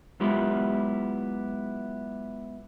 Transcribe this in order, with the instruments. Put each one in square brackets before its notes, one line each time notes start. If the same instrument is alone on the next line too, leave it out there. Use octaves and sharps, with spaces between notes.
[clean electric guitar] F#3 G#3 B3 E4 F4 G4